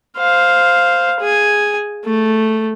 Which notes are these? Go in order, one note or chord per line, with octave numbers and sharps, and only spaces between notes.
C5 F5
G#4 G#5
A3